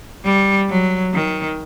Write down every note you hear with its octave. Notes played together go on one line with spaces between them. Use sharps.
G3
F#3
D#3